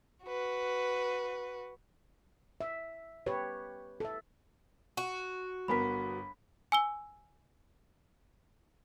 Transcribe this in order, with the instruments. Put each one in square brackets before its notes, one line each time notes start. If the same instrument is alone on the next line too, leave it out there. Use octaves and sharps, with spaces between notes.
[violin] F#4 B4
[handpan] E5
G4 B4 C#5
A4 E5
[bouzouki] F#4
[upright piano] G1 B3 A#4 [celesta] B5 B6
[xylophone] G#5 E6 G7